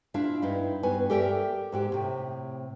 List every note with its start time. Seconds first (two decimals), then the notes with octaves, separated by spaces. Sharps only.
0.14 D4 E4 F4 E5 F5
0.42 G2 D#4 E4
0.83 G2 B3 F#4 B4 G#5
1.10 G4 A4 A#4 D5 E5 G5
1.72 G#2 F#4 G4
1.92 A2 C3